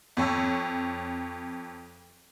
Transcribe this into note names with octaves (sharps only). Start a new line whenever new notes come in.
F2 C#5 E6